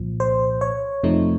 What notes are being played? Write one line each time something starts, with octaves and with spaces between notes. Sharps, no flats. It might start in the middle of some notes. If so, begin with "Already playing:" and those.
Already playing: C2 A#2 F3
C5
C#5
F2 C3 F3 A3 D#4